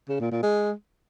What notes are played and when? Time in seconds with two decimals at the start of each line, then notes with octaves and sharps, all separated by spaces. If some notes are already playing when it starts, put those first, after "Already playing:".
0.08 C#3
0.20 A#2
0.31 A#2
0.43 G#3